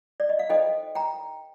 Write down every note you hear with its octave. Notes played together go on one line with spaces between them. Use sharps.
D5
D#5
F5
D#4 A4 C5 D#5 G5
G5 A#5